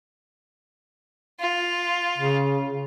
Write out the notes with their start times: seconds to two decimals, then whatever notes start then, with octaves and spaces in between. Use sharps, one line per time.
1.40 F4
2.18 C#3